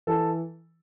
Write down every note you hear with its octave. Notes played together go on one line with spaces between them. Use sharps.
E3 A4